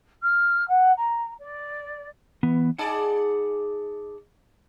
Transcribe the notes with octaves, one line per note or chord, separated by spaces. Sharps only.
F6
F#5
A#5
D5
E3 B3
D#4 G#4 D5 F#5 A5